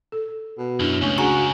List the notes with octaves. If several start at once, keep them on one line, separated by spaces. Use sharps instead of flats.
A4
B2
F#2 D4 E4
C#2 A3 C#4 D4 C#6
C#4 D4 F#4 G#4 G#5 A#5 C#6